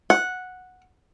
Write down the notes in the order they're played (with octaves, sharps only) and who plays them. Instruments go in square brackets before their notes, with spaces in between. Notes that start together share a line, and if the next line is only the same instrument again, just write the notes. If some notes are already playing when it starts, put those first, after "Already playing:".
[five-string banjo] F#5